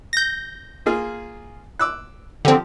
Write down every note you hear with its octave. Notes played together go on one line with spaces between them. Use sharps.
G6 A#6
A#3 F4 G#4
D6 E6 F#6
D3 F3 C4 G4